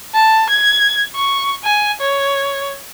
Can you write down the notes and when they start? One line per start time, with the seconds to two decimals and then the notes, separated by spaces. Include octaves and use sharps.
0.14 A5
0.50 G#6
1.15 C#6
1.64 G#5
2.01 C#5